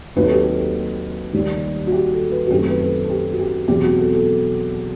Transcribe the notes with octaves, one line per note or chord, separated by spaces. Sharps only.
D#2 D#3 F#3 C4 B4
A4
G4
A4
D#2 D#3 G3
F#4
G4
A4
B4
F#4
F#2 D#3 A3 C4 G4
B4
A4
A4
G4
F#4
G4
E2 B2 F#3 C4 G4
F#4
A4
A4